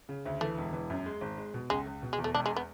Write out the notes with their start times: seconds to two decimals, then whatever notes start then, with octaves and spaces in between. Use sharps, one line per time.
0.09 C#3
0.25 D2
0.41 E3 A3
0.58 E1
0.73 E3
0.90 F#2
1.06 G#3
1.21 G#1
1.38 G#3
1.54 B2
1.70 C#2 G#3
1.86 C#2
2.03 B2
2.13 G#3
2.18 E2
2.24 A3
2.34 E1 D4
2.46 G#3
2.56 B3